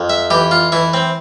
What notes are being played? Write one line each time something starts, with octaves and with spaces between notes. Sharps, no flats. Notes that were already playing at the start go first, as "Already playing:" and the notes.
Already playing: F2
E5
E3 G4
F4
E3 E4
C4